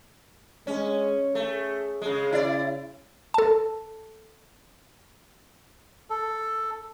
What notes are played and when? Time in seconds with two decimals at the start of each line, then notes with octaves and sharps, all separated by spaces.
0.67 G#3 C#4
1.35 A3 G#4
2.02 C#3 G#3
2.32 C#3 E4 D5
3.34 A4 A5
6.10 A4